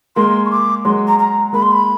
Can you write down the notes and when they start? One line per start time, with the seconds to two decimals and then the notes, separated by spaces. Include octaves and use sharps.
0.16 G#3 A#3 C6
0.45 C#6
0.51 D6
0.85 F#3 G#3 C6
1.07 A#5
1.19 A#5
1.53 G#3 A#3 B5
1.62 C6
1.71 B5